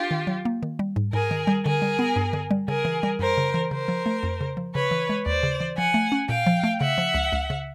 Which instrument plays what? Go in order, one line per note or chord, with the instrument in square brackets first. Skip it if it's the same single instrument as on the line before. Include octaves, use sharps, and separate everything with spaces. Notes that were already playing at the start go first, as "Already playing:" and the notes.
Already playing: [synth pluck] D4 [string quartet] F4 G4
[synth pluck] D#3
F#3
A#3
D#3
G3
G#2
[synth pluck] G#2 [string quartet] G#4 A#4
[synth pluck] D#3
G3
[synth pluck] D3 [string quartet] G#4 A#4
[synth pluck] G3
B3
G2
D3
G3
[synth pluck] C#3 [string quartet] G#4 A#4
[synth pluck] E3
G3
[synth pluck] F#2 [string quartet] A#4 C5
[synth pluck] C#3
E3
[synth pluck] C#3 [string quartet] A#4 C5
[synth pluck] F3
A3
F2
C#3
F3
[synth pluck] C#3 [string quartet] B4 C#5
[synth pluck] E3
G#3
[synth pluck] D#2 [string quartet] C5 D5
[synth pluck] C#3
E3
[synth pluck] F3 [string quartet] F#5 G#5
[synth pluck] A3
C#4
[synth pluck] A#2 [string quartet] F5 G5
[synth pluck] F3
A3
[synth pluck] C#3 [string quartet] E5 F#5
[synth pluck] F3
C#2
C#2
C#3